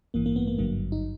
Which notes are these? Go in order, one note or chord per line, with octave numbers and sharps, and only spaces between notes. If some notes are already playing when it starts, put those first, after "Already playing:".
A1 G2 E3 A#3
A#3
B3
A#3
G#1 G2 D3 F#3 A#3
D#4